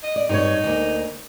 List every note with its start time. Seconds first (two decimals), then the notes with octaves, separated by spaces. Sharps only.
0.03 D#5
0.16 D5
0.29 G2 D#4 C5 C#5
0.64 D2 A#3